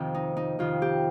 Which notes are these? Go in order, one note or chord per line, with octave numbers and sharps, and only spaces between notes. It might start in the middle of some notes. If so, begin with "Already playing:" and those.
Already playing: F2 C3 D#3
D#4
D#4
F2 C3 D#3 F4
G4